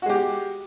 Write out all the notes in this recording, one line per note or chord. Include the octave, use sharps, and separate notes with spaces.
G#3 F#4 G4